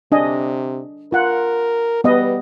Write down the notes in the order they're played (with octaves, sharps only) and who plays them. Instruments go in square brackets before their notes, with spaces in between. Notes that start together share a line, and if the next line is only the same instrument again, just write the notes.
[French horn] C3 [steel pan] D4 D#5 G#5
[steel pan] F4 F#5 [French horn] A#4
[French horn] G3 [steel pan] B3 B4 D#5